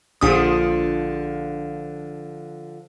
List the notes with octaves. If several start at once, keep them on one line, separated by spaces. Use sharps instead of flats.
A#1 D3 F3 D#6